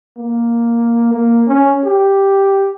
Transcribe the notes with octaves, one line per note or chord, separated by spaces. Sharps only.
A#3
A#3
C#4
G4